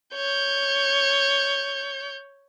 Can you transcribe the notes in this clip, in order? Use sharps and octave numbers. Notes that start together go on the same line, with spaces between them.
C#5 G6